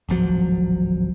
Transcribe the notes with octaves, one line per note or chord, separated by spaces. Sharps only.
D1 G#1 F3 F#3